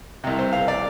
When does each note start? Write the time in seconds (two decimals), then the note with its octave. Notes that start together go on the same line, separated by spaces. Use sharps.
0.24 C2 C3
0.39 C5
0.53 F5
0.68 D5